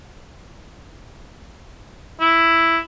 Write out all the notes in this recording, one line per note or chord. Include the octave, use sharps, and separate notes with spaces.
E4